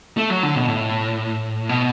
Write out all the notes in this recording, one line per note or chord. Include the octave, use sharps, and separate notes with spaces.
A3
F#3
D3
B2
A2
B2